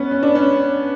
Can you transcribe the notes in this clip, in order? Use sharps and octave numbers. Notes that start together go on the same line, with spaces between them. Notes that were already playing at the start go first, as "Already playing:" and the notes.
Already playing: B3 C#4
C#4
D4
C#4